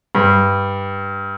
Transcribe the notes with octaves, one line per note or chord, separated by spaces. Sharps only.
G2